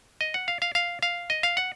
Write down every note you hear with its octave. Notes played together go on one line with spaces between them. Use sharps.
D#5
F#5
F5
F5
F5
F5
D#5
F5
F#5